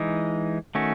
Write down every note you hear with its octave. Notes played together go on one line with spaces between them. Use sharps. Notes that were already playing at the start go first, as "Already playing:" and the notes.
Already playing: E3 G#3 D#4
D#3 A3 C#4 F#4